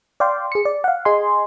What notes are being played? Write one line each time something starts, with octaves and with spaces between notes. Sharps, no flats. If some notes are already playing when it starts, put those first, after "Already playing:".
D5 F5 G5 C6
G#4 C#7
D5
F5 F#5
G#4 D#5 G#5 C6